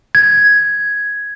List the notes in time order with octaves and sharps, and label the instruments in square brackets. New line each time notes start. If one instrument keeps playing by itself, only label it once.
[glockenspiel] G#6